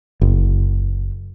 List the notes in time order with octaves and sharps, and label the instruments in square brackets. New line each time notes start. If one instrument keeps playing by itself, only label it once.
[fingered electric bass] F#1